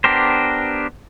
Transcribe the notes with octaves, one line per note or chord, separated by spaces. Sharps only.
B3 D4 G4 A#4 C5